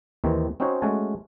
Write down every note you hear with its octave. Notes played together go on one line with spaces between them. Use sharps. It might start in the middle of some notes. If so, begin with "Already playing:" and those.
D#2 D#3 E3 C4
C4 C#4 D#4 F#4 C5 C#5
G#3 A3 C#4 F#4 G#5 A5